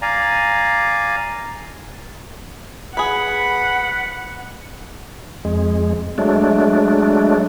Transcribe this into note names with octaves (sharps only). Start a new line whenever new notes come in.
D5 F5 G#5 A#5
G#4 B4 F#5 B5
F2 G#3
F#3 G#3 A3 D4